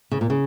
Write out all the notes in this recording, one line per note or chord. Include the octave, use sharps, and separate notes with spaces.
C#3
A#2
C#3